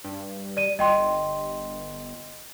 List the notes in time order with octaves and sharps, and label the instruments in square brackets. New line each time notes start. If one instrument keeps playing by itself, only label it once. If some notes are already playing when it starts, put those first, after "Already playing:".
[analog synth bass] G2
[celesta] D5 D#7
[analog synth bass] G1 [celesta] D#5 G5 C6